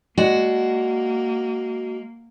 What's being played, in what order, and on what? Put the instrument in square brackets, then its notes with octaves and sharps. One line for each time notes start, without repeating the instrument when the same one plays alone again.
[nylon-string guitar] G#3 D5 F#5 [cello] A#3 [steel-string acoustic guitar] F#4